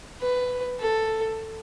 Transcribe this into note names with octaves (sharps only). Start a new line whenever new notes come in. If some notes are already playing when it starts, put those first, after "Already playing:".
B4
A4